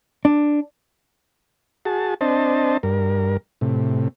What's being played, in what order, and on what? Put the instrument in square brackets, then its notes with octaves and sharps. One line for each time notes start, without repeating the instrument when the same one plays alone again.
[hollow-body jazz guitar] D4
[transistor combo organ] F#4 G#4 A5
C4 D4 C5 D#5 A5
G2 A#4
A2 C3